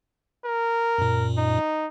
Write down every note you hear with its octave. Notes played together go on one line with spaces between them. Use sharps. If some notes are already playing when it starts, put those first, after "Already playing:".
A#4
F#2 A#2
D#4